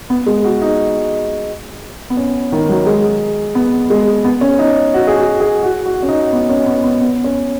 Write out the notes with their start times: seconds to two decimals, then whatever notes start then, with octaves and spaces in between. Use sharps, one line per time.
0.10 B3
0.26 G#3
0.44 F#4
0.62 D#4
2.10 B3
2.17 C#4
2.52 D#3
2.69 F#3
2.86 G#3
3.55 B3
3.90 G#3
4.24 B3
4.41 C#4
4.59 D#4
4.94 F#4
5.07 G#4
5.17 F#4
5.40 G#4
5.63 F#4
5.86 F#4
6.03 C#4
6.08 D#4
6.33 B3
6.49 C#4
6.66 B3
6.84 B3
7.01 B3
7.24 C#4